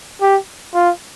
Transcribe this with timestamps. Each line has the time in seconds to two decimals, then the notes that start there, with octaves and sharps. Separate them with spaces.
0.21 G4
0.74 F4